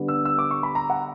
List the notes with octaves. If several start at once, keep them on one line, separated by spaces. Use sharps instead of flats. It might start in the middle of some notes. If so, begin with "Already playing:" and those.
Already playing: D3 G3 B3
E6
E6
D6
C#6
B5
A#5
F#5